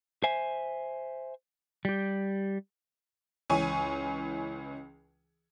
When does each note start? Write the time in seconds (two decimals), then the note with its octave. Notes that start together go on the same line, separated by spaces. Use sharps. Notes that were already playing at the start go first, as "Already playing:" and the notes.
0.24 C5 E5 G#5
1.85 G3 G4
3.50 C#2 E3 C#4 G#5 C#6